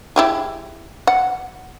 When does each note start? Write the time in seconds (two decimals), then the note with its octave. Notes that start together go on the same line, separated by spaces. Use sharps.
0.16 E4 G4 G#4
1.07 F#5